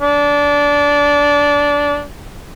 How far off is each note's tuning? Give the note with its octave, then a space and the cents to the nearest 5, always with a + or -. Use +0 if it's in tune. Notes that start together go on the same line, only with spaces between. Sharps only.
D4 -20